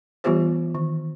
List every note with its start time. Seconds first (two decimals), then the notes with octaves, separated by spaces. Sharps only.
0.24 E3 G3 B3 F4 G4 C5
0.75 D#3